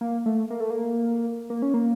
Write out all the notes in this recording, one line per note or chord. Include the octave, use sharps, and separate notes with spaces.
A#3
A3
A#3
A3
A#3
A#3
C#4
A#3